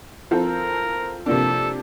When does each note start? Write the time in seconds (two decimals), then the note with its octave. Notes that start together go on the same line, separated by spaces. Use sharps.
0.31 F3 C4 F4 A4 A#4
1.26 C3 F3 A#3 D4 A4